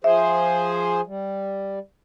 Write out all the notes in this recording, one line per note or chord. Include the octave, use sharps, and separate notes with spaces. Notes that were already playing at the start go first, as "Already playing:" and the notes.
F3 G#4 C5 E5
G3